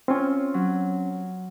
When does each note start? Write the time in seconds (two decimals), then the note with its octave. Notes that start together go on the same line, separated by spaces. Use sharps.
0.08 C4 C#4 F4 C#5
0.54 F#3